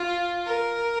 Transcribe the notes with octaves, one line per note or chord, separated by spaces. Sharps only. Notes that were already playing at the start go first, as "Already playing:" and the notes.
Already playing: F4
A#4